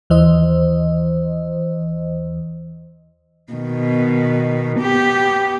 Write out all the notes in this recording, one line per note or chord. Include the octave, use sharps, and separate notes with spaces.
D#2 E3 C5 D#5
B2 D#3
B3 G4